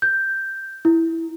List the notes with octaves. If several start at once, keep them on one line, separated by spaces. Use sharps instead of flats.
G6
E4